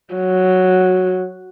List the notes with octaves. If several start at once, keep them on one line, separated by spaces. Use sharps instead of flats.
F#3